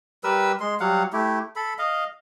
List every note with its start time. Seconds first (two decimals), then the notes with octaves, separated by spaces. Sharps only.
0.24 G3 A#4 B4 E6
0.60 G#3 C6
0.80 F#3 G3 F5 F#5
1.13 A3 E4 G4
1.56 A4 B5
1.78 D#5 F5